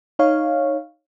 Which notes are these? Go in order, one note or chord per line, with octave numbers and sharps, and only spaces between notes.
D#4 C#5 F5